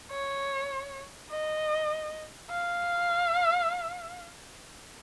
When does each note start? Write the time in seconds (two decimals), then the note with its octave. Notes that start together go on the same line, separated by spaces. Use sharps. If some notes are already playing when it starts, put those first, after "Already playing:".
0.11 C#5
1.31 D#5
2.50 F5